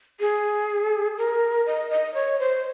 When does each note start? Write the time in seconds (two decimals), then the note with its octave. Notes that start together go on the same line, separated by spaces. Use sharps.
0.20 G#4
1.18 A#4
1.66 D#5
1.91 D#5
2.14 C#5
2.39 C5